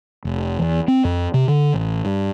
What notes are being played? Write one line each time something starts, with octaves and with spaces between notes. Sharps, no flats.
F1
E2
C4
F2
C3
D3
A1
G2